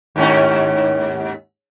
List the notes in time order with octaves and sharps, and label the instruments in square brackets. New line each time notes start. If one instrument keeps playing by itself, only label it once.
[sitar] D#2 G#2 C#4